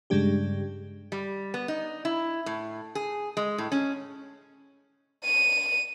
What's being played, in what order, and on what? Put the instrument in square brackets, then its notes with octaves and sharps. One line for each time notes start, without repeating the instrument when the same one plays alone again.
[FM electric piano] G2 C#3 G3 G#3 D4 G4
[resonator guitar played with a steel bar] G3
B3
D#4
E4
A2
G#4
G#3
A2
C#4
[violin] D#7